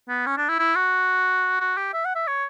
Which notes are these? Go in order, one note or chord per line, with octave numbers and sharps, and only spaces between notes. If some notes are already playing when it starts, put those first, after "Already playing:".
B3
C#4
D4
E4
E4
F#4
F#4
G4
E5
F#5
E5
C#5